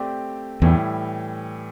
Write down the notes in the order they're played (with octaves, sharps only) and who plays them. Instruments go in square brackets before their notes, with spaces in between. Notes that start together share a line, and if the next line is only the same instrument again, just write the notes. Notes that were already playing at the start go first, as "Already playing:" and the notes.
Already playing: [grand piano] A3 C4 G4 D5
[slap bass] E2 [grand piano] A2 E3 G3